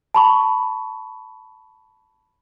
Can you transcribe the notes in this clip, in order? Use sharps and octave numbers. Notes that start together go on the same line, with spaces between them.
A5 B5 C#6